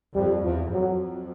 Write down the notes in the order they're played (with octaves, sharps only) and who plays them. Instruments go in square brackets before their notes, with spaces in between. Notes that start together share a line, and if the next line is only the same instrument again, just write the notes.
[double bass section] F2 [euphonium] G3
[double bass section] E2 [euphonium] F3
[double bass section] F2 [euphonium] F#3